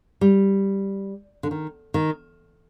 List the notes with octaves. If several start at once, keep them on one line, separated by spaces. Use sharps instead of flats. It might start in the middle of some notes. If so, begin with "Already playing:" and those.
G3
D3
D#3
D#3